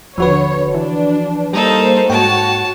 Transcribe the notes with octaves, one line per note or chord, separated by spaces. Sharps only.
D#1 D3 F3 F#4 B4 C#5
E3 D4
G3 A#3 D#4 A4 C5
G#2 F#4 C#5 G5 A5